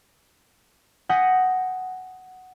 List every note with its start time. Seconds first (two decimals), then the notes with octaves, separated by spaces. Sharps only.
1.09 F#5 G#5 D#6 G6 A#6 B6